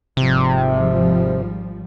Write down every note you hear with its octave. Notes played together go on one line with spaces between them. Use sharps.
G#1 C3 F3 G3